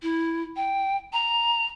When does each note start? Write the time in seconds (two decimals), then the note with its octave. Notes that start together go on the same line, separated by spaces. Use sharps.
0.02 E4
0.56 G5
1.13 A#5